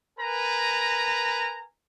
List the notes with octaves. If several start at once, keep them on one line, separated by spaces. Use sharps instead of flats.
A#4 B4 G#5 A#5